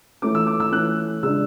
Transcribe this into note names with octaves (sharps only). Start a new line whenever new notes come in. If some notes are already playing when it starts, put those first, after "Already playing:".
E3 A3 C#4 D6
E6
D6
E6
E3 A3 C#4 F#6
C#3 G#3 D4 E6